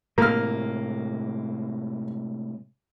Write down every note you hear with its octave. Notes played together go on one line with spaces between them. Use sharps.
A2 C3 G#3 A#3 F6